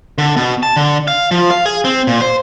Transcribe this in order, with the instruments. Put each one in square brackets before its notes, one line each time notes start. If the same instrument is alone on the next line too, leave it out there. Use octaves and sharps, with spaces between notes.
[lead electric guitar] D3
B2
A5
D3
F5
F3
F5
G#4
C4
A#2
C5